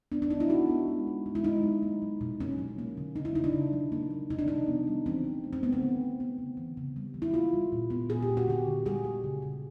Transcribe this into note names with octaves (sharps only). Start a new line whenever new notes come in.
B3 D4
D4
B3 D#4
E4
B3 F#4
B3
G#3
G#3
G#3
E4
G#3 D#4
F#3
A#3
F#3
B2
A#3 C#4
F#3
A#3
D3
C#3 D#4
E4
C#3 D#4
D4
C#3
F#3
A#3
A#3
C3 D#4
D4
F3 D#4
B3
G3
E3 C4
G3
A3
C4
A3 B3
C4
D3
D3
B3
C#3
E3
C#3
G3
E3
E4
A#3 F4
G3
A#2
B3
A#2 G#4
G4
A#2
F#4
D3 G4
D3
G3 G#4
G3
C#3
C#3